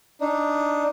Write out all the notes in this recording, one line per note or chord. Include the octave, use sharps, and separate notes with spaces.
D4 D#4